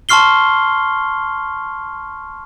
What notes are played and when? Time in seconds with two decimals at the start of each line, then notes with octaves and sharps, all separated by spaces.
0.09 A5 C6 C#6 F6 C7 G7